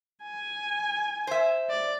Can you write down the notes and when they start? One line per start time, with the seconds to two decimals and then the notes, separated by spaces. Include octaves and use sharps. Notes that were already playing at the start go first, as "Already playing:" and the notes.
0.23 G#5
1.27 C5 E5
1.69 D5